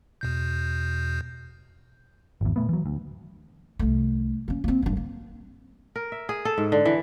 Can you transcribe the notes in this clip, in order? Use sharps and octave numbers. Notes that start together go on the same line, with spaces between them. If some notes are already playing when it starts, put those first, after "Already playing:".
E2 B2 G6
G#1 E2
A#2 A3 B3
E3 F#3
D2
C2 A3
A#3 C#4
A#3 C4
F#1 G2
A#3
A#4
E5
G#4
A4
G#2
D3
E3